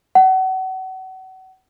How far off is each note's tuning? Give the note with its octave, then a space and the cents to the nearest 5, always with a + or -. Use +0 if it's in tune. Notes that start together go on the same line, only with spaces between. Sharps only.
F#5 +30